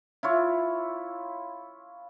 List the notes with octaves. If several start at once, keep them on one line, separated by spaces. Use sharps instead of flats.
E4 F4 C#5